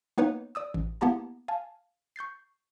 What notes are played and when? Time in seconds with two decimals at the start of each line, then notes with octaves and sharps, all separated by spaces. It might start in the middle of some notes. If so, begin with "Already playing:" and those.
0.18 A#3 B3 D#4 B4 C#5 F#5
0.55 D5 D#6 E6
0.74 A1
1.01 A#3 B3 E4 G4 A5 A#5
1.48 F5 G#5 A5
2.16 C#6 G6 A6 C7